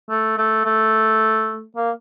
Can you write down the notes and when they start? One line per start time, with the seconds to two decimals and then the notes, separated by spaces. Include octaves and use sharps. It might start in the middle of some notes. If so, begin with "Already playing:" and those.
0.09 A3
0.38 A3
0.65 A3
1.76 A#3